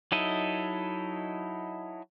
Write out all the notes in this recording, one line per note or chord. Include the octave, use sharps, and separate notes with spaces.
F#3 D#4 E4 A4 D#5